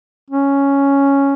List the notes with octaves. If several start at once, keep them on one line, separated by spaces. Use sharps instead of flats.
C#4